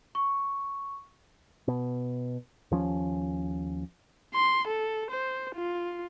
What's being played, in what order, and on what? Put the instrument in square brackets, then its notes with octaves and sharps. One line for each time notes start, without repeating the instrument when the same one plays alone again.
[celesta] C#6
[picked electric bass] B2
D#2 F3 C#4
[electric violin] C6
A4
C5
F4